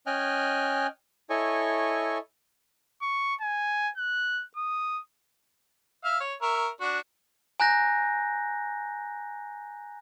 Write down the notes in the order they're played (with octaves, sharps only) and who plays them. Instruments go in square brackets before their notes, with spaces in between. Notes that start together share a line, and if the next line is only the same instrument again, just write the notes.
[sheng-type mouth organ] C#4 D#5 G5 G#5 F6 F#6
E4 A4 C#5 D#5 G#5 C#6
[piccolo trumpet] C#6
G#5
F#6
D#6
[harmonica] E5 F5
C#5
A#4 E5 C#6
D4 F#4
[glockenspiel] G#5 A#5 F#6 G6 A#6